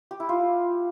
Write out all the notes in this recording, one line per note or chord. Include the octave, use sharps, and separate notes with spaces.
G4
E4
F4